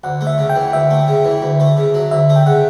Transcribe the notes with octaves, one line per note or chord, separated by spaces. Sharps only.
D2 F#5
A3
E5
C#3
G5
E3
D2 E5
A3
C#3
E3
D2
A3
C#3
F#3
D2 E5
A3
G5
C#3 F#5